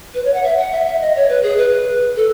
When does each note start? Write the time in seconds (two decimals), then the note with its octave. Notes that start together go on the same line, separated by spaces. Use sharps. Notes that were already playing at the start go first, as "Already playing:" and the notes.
0.14 B4
0.24 C#5
0.34 F#5
0.43 E5
0.57 F#5
0.72 E5
0.87 E5
1.00 D#5
1.15 C#5
1.29 B4
1.43 G#4
1.58 B4
2.16 A4